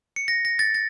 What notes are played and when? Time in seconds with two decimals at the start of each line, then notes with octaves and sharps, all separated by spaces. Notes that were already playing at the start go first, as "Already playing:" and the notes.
0.16 C#7
0.28 A#6
0.45 A#6
0.59 A6
0.74 A6